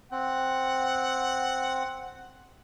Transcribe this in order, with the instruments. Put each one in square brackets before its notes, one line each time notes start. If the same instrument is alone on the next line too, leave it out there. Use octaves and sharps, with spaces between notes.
[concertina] C4 [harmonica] F#5